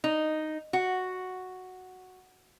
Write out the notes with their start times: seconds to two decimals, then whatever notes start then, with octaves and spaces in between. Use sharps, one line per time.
0.04 D#4
0.73 F#4